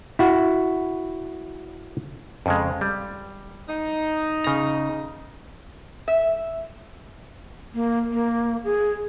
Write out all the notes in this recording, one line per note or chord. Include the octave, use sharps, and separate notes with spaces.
E4 F#4 F#5
F2 C#3 G#3
G3
D#4
C#3 A#5
E5
A#3
A#3
G#4